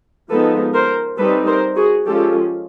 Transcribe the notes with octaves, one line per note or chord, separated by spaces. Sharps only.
F3 G#3 B3 D#4 A4 B4
A#4 C5
G3 C4 D#4 A4 B4
A#4 C5
F#4 G#4
F3 G#3 C#4 F4 G4 A4